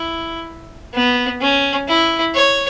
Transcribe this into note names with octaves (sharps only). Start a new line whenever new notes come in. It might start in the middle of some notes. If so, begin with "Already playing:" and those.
Already playing: E4
B3
C#4
E4
C#5